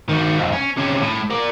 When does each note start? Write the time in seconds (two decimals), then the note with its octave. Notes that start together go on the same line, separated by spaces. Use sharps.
0.09 D#3 F#4
0.37 B1 F2
0.53 C#4
0.78 C3 C#4
1.03 A2
1.30 A#4 D5